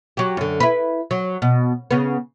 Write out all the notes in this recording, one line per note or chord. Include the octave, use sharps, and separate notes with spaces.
F#3 G4
F#2 D3
E4 B4
F#3
B2
C#3 B3